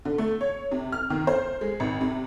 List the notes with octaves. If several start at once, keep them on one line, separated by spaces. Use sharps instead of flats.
D3
A3
C#5
C3
F6
D#3
C5
G#3
G#1
C3